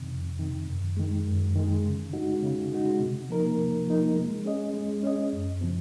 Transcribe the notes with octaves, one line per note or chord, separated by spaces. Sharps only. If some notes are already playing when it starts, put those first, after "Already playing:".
Already playing: F2 C3 D#3
F2
C3 D#3
F#2
D#3 G#3
F#2
D#3 G#3
C#3
G#3 D#4 F#4
C#3
G#3 D#4 F#4
C3
F3 A#3 D#4 A#4
C3
F3 A#3 D#4 A#4
G#3
C#4 G#4 D#5
G#3
C#4 G#4 D#5
F#2
C#3 F3 C4